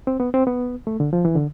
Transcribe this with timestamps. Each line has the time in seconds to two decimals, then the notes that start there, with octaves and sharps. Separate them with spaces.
0.07 C4
0.20 B3
0.34 C4
0.47 B3
0.87 A3
1.00 D3
1.13 F3
1.25 E3
1.35 D3